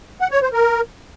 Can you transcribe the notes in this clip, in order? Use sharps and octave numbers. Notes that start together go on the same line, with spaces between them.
F#5
C#5
C5
A#4